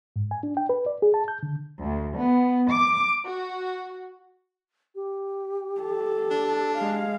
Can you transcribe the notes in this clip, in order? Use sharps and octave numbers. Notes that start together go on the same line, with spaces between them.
G#2
G#5
D4
G5
B4
D5
G#4
A5
G6
D3
D2
B3
D6
F#4
G4
A4
D4
G#3 F5